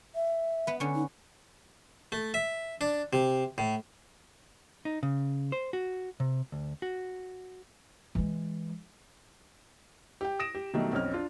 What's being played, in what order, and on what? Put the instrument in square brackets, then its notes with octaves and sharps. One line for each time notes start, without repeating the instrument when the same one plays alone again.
[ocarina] E5
[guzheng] B3 B4
D3 C#4
[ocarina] D#4
[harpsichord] A3
E5
D4
C3
A2
[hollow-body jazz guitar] D#4
C#3
C5
F#4
C3
D2
F#4
[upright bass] E3 G#3
[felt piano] G4 G5
D#6 A#6 D7 E7
G4
B2 D#3 F#3 G3 A3
B1 F2 C#4 F6
D4 F4